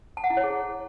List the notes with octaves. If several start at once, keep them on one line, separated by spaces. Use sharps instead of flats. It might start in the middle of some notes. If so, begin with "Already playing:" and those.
A5
F#5
E4
C#5
G#4